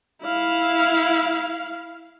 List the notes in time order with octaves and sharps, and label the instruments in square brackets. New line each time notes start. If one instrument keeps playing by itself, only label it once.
[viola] E4 F5